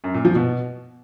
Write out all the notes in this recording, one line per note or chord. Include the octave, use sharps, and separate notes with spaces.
F#2
A#2
F3
B2